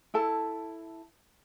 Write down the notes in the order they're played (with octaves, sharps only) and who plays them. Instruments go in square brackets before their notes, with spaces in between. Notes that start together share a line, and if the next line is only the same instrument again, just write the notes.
[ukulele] E4 A4 A5